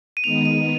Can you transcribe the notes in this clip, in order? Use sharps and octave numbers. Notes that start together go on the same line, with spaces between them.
D#7
D#3 G#3 B3 D#4 F7
D#7